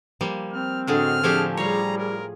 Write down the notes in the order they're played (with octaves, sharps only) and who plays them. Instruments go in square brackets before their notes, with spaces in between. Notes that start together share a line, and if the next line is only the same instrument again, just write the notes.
[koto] F3 G3 A#3
[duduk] C4 [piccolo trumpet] F6
[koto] A2 D3 G#4 [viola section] F#4 D#5 [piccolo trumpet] F6
[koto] F3 A3 G4 [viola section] C4 D4 G#5 [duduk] G#4
[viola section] F3 G#4 [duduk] G3 [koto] C#5 F5 [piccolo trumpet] A#5
[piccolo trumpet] A#4